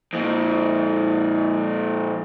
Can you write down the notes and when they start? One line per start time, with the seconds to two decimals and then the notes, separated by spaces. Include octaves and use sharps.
0.13 F2 A#2